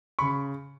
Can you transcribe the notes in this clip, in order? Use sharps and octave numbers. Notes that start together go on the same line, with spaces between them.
C#3 B5 C#6